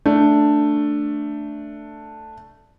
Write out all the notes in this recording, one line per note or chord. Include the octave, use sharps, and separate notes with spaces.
A3 D4